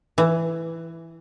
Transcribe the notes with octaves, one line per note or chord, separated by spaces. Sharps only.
E3